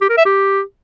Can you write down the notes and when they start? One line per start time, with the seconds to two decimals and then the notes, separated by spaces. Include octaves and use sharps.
0.01 G4
0.10 A#4
0.18 E5
0.26 G4